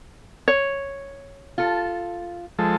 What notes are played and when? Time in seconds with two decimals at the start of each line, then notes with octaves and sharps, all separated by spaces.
0.48 C#5
1.58 F4 A4
2.59 F3 G#3 A4